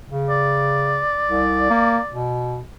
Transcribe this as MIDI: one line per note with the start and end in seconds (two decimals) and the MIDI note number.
0.10 1.04 49
0.30 2.23 74
1.29 1.69 36
1.70 1.99 58
2.11 2.62 47